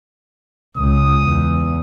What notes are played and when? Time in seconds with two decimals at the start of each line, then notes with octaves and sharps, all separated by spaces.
0.77 C#2 D#6
1.23 E2